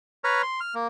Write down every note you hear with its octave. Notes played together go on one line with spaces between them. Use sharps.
B4 C#5 A#5 F6
C6
F6
A#3